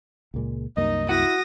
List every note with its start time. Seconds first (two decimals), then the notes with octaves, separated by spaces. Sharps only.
0.34 C#2 A#2 G#3
0.77 C2 F#2 A#3 D#4 D#5
1.09 E4 F#4 D#6 A#6